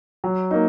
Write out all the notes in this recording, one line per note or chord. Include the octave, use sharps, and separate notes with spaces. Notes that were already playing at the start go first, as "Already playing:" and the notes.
F#3
A#3 D#4